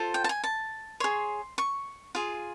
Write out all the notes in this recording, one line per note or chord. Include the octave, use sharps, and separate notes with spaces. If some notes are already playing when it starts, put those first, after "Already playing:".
Already playing: F4 A4 C5
G5
A5
G#5
A5
G#4 C#5 C6
C#6
F4 G#4